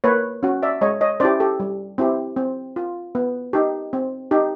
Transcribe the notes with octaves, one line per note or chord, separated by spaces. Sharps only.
A#3 B4 C#5
C#4 F#4
D5 E5
G#3 C#5 D#5
C#5 D#5
C#4 E4 G4 C5 D5
G4 A4
G3
C4 E4 G4
C4
F4
B3
D#4 G4
C4
D#4 G4